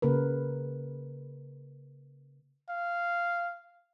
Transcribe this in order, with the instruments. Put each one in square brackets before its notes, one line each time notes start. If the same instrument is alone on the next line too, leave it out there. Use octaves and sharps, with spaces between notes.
[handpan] C#3 A#3 A#4 B4
[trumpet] F5